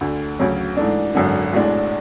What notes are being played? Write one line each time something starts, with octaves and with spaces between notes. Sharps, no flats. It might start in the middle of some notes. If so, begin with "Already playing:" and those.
D2 D3 A3
D2 C#3 F#3 C#4
G#2 E3 A3 D4
G#1 F#2 D3
B1 A2 G#3 D4